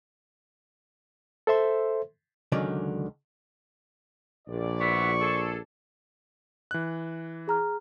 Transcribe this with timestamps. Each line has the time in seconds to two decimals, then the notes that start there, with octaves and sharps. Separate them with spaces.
1.47 A4 C5 E5 C6
2.52 C#2 D3 D#3 F#3 C#4 D5
4.48 A#1 D5
4.80 B3 E4 F#4 C#6
5.21 G#4 A4
6.71 E3 F#6
7.48 G#4 A#5 F6